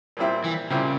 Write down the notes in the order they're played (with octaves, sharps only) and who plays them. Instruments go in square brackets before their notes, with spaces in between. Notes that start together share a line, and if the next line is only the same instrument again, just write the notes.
[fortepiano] A#2 G3 C4 E4
[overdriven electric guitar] E3
[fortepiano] A#2 G3 C4 E4 [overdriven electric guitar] C#3